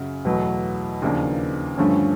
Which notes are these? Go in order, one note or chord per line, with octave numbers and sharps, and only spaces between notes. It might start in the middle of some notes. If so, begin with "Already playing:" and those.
Already playing: F#2 C#3 F#3
E2 B2 F#3 A3
D#2 C#3 F3 A#3 D4
G2 D3 F3 A3 C#4